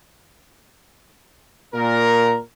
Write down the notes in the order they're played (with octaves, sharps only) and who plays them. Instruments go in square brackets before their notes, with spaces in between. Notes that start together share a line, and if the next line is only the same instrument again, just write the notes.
[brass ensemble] A#2 A#4